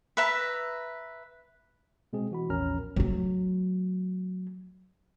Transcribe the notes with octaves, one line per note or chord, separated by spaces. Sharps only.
B4 E5 A#5
B2 G#3 C4 G#4
E3 F#4 B5
A#1 E2 C#4 A#4 A#5 F6
F#3 A3